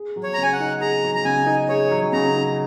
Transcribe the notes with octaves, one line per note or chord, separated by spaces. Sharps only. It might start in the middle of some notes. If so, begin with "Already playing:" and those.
Already playing: G#4
F#3
C#5
A#5
C#3 G#5
F#5
D#4
G#4 A#5
F#3
A#5
C#3 G#5
D#4
G#4 C#5
F#3
C#3 A#5
D#4